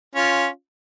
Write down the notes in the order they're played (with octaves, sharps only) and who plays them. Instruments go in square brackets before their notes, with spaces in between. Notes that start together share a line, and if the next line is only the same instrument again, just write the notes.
[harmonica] C#4 F4